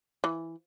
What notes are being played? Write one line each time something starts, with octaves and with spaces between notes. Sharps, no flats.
E3